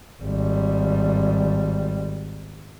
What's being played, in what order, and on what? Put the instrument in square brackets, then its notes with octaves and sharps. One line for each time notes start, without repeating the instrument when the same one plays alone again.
[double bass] G#1 G3